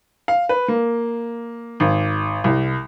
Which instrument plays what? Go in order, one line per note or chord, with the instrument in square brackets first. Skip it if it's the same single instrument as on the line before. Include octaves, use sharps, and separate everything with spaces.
[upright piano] F5
B4
A#3
G#1
C2